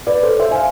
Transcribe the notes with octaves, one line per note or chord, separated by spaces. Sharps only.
B4 D5
A4 C5
C5 E5
G#5
F5